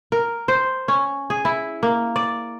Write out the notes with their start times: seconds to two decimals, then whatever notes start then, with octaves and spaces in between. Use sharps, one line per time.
0.12 A#4
0.48 C5
0.88 C#4
1.30 G#4
1.45 E4
1.83 A#3
2.16 D5